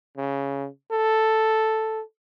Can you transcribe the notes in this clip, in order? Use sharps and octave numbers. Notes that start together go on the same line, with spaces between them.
C#3
A4